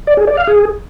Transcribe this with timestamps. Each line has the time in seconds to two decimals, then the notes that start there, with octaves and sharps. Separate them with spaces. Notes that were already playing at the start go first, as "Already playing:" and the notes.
0.07 D5
0.17 G#4
0.27 D5
0.37 F5
0.47 G#4